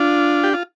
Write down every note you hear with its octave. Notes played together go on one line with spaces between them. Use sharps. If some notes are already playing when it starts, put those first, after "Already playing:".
Already playing: D4 F4
G4
F4